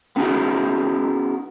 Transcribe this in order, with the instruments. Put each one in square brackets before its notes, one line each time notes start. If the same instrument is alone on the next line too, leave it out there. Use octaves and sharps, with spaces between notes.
[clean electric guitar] B3 C#4 D#4 E4 F#4 G#4